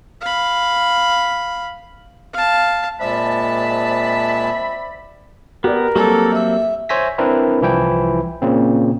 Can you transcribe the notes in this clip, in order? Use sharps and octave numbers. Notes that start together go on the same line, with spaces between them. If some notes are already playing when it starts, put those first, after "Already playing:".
F5 B5
F5 A5
A#2 G#3 C4 D5 E5 A5 B5
B3 G4 A#4 D5
F#3 G3 A#3 C4 A4
E5
C5 C#5 E5 G#5 A#6 B6
C4 D4 E4 A#4 B4
C2 E3 F3 E4 G5
A#2 C#3 C4